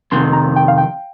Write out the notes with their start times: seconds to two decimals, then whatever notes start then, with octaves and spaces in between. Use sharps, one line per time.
0.11 F2 C3 D#3 C6
0.33 A#5
0.56 G5
0.68 F5
0.78 G5